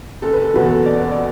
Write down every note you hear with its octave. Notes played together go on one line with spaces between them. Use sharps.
F#1 A4
B4
A4
E2 B2 F#3 B4
A4
F#1 D5
B4
D5